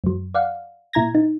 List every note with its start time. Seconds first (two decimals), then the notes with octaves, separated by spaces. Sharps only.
0.04 F#2 F#3
0.34 D5 F5 F#5
0.93 A#2 E4 A#5 G#6 A#6
1.15 D#4